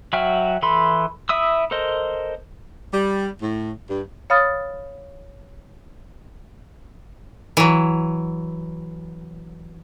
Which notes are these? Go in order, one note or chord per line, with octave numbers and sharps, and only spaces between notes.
F#3 F#4 E5 G5 F6
E3 A4 B5 C6
E4 E5 D#6 E6
A4 A#4 C5 D#5
G3
A2
G2
C#5 F5 B5 D#6 F6 A6
E3 F#3